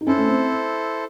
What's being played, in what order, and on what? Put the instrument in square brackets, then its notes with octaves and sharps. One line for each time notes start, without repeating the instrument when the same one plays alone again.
[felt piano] D#4
[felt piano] C#4 [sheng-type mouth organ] E4 A4 C5
[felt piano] A3
C4